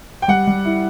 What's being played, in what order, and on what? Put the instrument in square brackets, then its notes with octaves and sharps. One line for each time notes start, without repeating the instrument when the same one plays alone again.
[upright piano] G5
[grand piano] G3 [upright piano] F#5
[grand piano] G3
E4